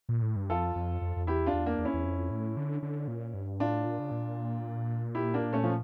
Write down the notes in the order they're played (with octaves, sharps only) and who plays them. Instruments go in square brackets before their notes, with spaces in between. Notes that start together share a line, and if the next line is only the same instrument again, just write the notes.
[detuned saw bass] A#2
A2
G2
[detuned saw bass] F2 [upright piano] F4 A4
[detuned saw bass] F2
F2
F2
[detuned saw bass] E2 [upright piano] E4 G4
[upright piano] D4 F4
[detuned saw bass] E2
[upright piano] A#3 D4
[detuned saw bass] E2
[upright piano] C#4 E4
[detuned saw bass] E2
F2
A2
D3
D3
A#2
G2
[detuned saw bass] A2 [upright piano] D4 F4
[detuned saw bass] A#2
C#3
A#2
[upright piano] E4 G4
A#3 D4
A3 C#4
F3